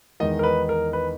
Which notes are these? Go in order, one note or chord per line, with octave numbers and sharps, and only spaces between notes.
E2 D#3 G#3 D#4 D#5
A#4
B4
A#4
B4